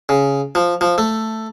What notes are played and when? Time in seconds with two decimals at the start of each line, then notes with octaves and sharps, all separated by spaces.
0.09 C#3
0.55 F3
0.81 F3
0.98 A3